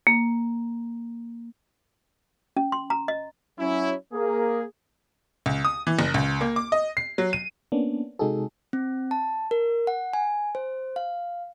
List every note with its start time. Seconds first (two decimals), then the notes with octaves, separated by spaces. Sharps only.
0.07 A#3
2.57 C#4
2.72 C6
2.90 A#5
3.08 D#5
3.58 F#3 C#4 E4
4.12 A#3 G#4
5.46 C#2
5.65 D#6
5.87 E3
5.99 F#1
6.14 C#2
6.41 A#3
6.56 D6
6.72 D#5
6.97 C7
7.18 F#3
7.33 D#7
7.72 A#3 B3 C#4 D4
8.19 C3 G#3 D#4 F#4 G#4 A4
8.73 C4
9.11 A5
9.51 A#4
9.87 F#5
10.13 G#5
10.55 C5
10.96 F5